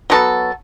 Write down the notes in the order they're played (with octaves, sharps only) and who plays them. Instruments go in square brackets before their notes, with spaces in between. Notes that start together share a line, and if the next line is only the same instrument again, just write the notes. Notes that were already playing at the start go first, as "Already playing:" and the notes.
[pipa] F#3 B3 F#4 A4